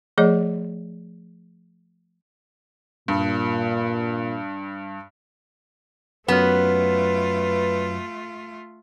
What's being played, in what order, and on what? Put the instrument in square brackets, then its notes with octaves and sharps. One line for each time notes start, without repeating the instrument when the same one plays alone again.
[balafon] F3 A3 G#4 C#5 D#5
[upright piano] G2 [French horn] A#2
[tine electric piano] F#2 F#3 F6 [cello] A3 F4 [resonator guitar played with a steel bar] B3 [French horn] B4